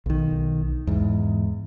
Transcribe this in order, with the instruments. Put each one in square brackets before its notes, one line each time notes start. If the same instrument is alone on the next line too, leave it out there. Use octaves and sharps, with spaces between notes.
[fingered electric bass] B1 D#3
E2 G#2